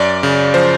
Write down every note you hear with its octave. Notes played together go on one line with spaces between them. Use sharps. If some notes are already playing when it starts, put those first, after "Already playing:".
Already playing: F#2 D5
C#3
F3 C5